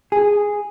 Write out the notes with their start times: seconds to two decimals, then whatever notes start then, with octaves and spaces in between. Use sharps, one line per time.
0.12 G#4